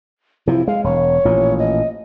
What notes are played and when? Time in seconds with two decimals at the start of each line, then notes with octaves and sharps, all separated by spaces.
0.47 C3 F3 E4
0.67 G#3 F5
0.84 E1 C#5
1.25 A1 A#2 F3
1.59 D#5